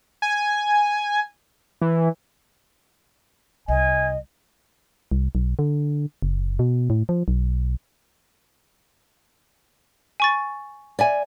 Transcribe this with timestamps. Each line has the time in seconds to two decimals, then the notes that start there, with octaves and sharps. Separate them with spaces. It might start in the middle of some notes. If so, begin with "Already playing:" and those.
0.22 G#5
1.81 E3
3.68 C2 D#5 G#5
5.12 C2
5.35 B1
5.59 D3
6.22 F#1
6.59 B2
6.90 A2
7.09 F3
7.28 B1
10.20 G#5 C#6 A6
10.99 D5 E5 G#5